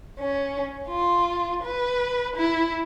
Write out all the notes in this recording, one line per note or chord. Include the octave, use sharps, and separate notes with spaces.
C#4
F4
B4
E4